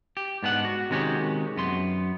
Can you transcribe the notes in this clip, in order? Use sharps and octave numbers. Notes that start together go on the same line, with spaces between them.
G4
G#2 B3 D4 F#5
F#4
C3 D#3 G#3 C#4 F#4 G4
F#2 B3 C6